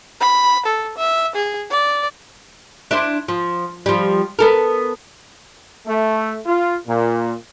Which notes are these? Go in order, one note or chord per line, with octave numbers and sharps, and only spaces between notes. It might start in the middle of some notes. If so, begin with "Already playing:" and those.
B5
A4
E5
G#4
D5
D4 E4 C5
F3
F3 G3
B3 A4 A#4
A3
F4
A#2